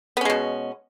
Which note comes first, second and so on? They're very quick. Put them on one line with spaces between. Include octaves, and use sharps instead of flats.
B3 C#4 G#3 B2